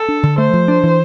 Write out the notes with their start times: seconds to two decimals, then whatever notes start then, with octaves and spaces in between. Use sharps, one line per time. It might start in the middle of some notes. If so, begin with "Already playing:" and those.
Already playing: A4
0.08 D4
0.23 D3
0.38 A3 C5
0.53 F3
0.68 D4
0.83 E3